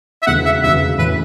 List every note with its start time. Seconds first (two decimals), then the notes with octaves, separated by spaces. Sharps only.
0.22 E5
0.27 E1 D2 C#3 E3 F#5
0.45 E5
0.62 E1 D2 C#3 E3 E5
0.98 A2 E3 A3 C#4 B4